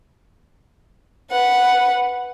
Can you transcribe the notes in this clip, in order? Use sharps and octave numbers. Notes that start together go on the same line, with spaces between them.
B4 F#5